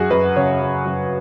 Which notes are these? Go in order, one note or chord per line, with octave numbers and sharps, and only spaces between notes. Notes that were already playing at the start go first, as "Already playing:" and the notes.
Already playing: F#2 F#3 F#4 G#4
F#2 B4
C#3 C#5
F#3
F#2